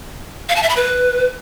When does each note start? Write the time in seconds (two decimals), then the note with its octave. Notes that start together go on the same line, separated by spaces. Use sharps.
0.49 F5
0.56 A5
0.63 E5
0.70 B5
0.76 B4